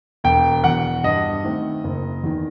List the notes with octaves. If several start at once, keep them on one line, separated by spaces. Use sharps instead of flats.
E1 G5
E2 B2 F#5
G2 D#5
D#3 A3 C4
F#1
E2 D#3